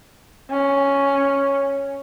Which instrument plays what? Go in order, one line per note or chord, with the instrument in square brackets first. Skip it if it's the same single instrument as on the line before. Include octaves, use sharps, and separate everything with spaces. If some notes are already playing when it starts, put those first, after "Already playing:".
[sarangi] C#4